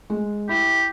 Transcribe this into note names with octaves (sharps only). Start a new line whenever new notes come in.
G#3
E4 G4